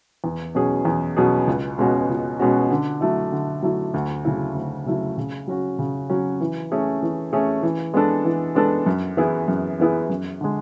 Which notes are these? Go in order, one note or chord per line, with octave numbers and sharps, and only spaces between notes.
E2
B2 F#3 C#4 G#4
E2
B2 F#3 C#4 G#4
C#2
B2 G#3 C#4 F#4
C#2
B2 G#3 C#4 F#4
D3
F#3 A3 E4
D3
F#3 A3 E4
D2
C#3 F#3 A3 E4
D2
C#3 F#3 A3 E4
C#3
F#3 C#4 F#4
C#3
F#3 C#4 F#4
E3
A3 C#4 G#4
E3
A3 C#4 G#4
E3
G#3 B3 D4 A4
E3
G#3 B3 D4 A4
F#2
E3 B3 E4 G#4
F#2
E3 B3 E4 G#4
F#2
D3 G#3